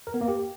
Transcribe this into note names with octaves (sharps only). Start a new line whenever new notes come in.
A#4
B3
A#3
G4